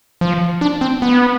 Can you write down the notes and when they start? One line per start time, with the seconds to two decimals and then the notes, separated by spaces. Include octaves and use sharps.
0.21 F3
0.61 D4
0.81 C4
1.02 B3